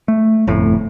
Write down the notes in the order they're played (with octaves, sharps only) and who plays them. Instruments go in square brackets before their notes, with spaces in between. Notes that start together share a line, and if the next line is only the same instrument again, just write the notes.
[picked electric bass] A3
G1 F2 A2